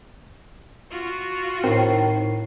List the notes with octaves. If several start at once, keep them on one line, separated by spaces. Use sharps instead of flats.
F4 F#4
A2 D#3 C4 C7